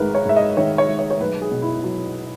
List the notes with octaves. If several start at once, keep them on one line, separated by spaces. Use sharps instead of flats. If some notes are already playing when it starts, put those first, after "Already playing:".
Already playing: G#1 G#3 A#4 B4
C#5
G#2 E5
D#5
D#3 C#5
C#5
G#3
C#5
C#5
B1 B4
G#4
B2
E4
F#3